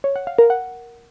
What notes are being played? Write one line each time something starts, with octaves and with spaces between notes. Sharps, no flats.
C#5
F#5
F5
A#4
F#5